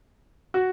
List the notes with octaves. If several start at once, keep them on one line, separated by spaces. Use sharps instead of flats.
F#4